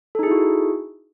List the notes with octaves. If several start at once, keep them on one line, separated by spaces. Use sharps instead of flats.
D#4 E4 F#4 G#4 A4